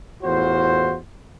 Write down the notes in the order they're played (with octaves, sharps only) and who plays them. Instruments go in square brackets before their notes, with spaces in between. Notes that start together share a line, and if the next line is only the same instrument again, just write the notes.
[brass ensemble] E2 A2 F4 F#4 C5